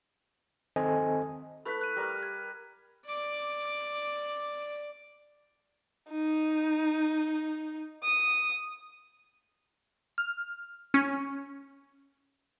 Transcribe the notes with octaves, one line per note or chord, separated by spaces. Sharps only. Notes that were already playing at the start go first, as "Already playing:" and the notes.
D#3 C4 A4 C5 D#5 G#5
A3 E4 B4 B5 F#6 B6
F#6 D#7
G3 A#4 F5
G#6
D5 D6
D#4
D#6
F6
C#4